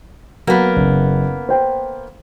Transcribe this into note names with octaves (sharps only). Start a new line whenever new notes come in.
F#3 A#3 B3
F#1
C5 G5